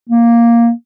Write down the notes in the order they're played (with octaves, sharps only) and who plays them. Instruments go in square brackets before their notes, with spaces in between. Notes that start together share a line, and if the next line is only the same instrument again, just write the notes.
[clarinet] A#3